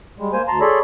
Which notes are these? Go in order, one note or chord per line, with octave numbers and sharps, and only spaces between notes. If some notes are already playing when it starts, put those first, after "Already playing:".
G3 G#3
A#3 C5 G#5
D2 A5 A#5 C6
G#4 A4 C#5 D5 B5 C6